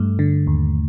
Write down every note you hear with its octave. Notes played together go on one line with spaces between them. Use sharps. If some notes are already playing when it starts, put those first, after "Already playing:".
Already playing: G2 A3
D3
D#2